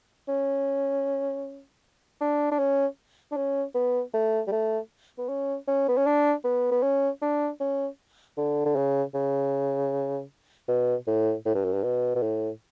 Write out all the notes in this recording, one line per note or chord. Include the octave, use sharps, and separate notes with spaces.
C#4
D4
D4
C#4
D4
C#4
B3
A3
G3
A3
B3
C#4
C#4
B3
C#4
D4
B3
B3
C#4
D4
C#4
D3
D3
C#3
C#3
B2
A2
A2
G2
F#2
G2
B2
B2
A2